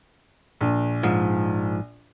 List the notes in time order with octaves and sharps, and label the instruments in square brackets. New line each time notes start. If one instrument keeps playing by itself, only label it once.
[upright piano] A#1
[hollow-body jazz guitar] G#2 F3